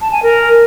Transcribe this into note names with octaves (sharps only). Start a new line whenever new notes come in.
A5
G#5
A#4